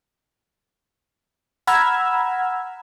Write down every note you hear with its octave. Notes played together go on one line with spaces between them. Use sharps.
F#5 A#5 B5 E6 F6 G#6